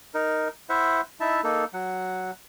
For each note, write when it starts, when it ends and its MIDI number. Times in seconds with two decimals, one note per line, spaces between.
0.14 0.48 63
0.14 0.48 70
0.69 1.01 64
0.69 1.01 72
0.69 1.01 76
0.69 1.01 78
1.20 1.41 63
1.20 1.41 64
1.20 1.41 76
1.20 1.41 81
1.44 1.65 58
1.44 1.65 63
1.44 1.65 69
1.73 2.31 54
1.73 2.31 78